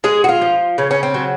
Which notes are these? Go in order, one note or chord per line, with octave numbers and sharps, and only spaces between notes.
G#3 G#4
F#4
F4
F3
C#3 C#4
C#4
C4
F#3